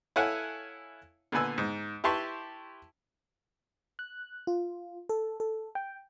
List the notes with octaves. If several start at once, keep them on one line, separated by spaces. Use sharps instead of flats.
E4 A4 C#5 F5 F#5 G#5
A#2 D3 B3 B4 G#5 E6
G#2
E4 G4 B4 A5 C6 C#6
F#6
F4
A4
A4
G5